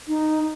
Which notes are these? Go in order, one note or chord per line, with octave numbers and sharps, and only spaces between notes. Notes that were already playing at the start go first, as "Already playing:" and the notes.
D#4